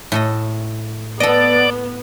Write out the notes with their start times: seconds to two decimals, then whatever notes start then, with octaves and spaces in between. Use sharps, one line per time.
0.12 A2 A4 D#5
1.20 B3 A4 D5 D#5